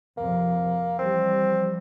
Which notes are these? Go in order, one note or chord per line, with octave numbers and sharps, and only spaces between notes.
F2 C3 F3 A#3
E3 F3 G3 C4